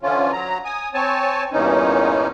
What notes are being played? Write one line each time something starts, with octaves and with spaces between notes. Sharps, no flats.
D3 E3 F3 C#4 F4
F#3 A#5
G#5 D#6
C4 C#5 G#5 A5
E2 G2 A#2 E3 C#4 D#4